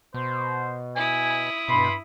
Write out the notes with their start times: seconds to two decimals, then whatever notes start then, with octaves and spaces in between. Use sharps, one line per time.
0.14 B2 C5
0.96 E4 G#5 D#6
1.69 G2 B2 B5 C6